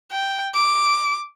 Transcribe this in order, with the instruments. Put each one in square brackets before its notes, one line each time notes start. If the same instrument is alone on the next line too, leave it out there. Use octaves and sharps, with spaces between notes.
[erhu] G5
D6